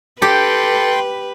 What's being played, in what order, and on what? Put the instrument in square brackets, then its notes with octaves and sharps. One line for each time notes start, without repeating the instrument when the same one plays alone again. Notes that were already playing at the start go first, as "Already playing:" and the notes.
[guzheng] G4 [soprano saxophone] A4 [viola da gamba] B4 [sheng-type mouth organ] G5 C6